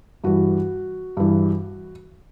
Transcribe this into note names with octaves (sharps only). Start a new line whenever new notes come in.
G2 E3 F#4
G2 E3